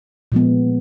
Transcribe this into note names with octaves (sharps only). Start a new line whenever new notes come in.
A#2 F3 G#3 B3